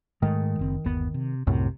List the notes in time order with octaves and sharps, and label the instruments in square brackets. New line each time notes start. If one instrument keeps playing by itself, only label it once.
[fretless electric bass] G#2 G#3 A3 [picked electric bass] D#3
[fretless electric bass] F#1 C4
G1 D#2 B3
C3
[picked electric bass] C2 F#2 A2 [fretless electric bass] C3